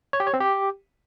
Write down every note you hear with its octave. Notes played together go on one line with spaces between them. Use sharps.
C#5
G4
C#5
C4
G4